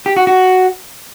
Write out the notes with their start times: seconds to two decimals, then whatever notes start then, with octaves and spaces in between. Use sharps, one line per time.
0.06 G4
0.17 F#4
0.27 F#4